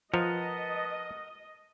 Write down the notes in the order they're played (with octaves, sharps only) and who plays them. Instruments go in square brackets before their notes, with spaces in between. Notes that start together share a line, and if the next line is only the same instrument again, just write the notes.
[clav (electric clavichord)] F3 [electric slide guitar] A#4 F#5 A#5 [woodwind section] B4 A5 [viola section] D#5